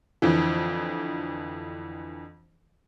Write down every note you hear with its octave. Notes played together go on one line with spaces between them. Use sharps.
F2 D3 E3